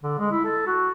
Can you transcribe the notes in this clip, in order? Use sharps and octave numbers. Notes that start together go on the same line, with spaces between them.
D3
G#3
E4
A4
F#4